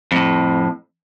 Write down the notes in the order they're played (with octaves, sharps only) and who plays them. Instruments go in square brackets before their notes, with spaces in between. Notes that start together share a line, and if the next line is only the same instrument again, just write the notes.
[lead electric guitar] F2 A2